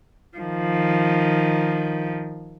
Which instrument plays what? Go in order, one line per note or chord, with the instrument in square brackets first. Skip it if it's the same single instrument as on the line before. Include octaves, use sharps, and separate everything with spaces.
[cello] D#3 F3